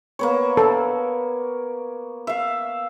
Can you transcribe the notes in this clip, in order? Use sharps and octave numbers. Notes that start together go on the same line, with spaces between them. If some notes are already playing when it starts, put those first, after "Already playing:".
A#3 B3 C#5
A4
E5 F5